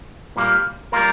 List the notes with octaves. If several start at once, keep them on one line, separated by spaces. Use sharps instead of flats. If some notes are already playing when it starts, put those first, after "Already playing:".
A#2 G3 A#3
G3 A#3 F4 A#4